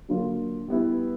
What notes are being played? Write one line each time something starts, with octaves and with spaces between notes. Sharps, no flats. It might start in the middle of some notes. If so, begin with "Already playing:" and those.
D3 F#3 A#3 D4 F4
G3 B3 E4